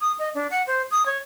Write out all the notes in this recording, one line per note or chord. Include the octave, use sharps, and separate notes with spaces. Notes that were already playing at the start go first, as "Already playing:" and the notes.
D#6
D#5
D4
F#5
C5
D#6
C#5